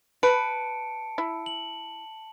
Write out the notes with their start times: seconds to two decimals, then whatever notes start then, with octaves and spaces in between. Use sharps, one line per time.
0.23 B4 A5 C#7 D7
1.18 E4
1.46 F#7